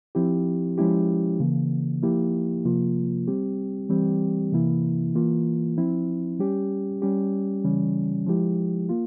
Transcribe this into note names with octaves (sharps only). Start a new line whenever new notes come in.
F3 C4 E4 G4
F3 G#3 C#4 E4 G4
C#3 E3 A#3
F3 A#3 E4 G4
C3 F3 A#3 F4
G3 C4 G4
E3 G3 C4 G4
C3 E3 A#3 E4
E3 A#3 F4
F3 C4 E4
G3 C#4 G4
G3 C#4 G4
C#3 E3 G3 C#4
F3 G#3 E4 G4
A#3 F4